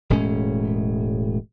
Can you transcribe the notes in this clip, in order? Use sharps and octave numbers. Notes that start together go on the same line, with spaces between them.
E1 A2 G#3 C#4